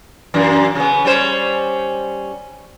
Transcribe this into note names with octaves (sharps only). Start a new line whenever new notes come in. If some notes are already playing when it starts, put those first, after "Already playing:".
F#2 A#2 E3
C#3 B3
G3 C#4 C5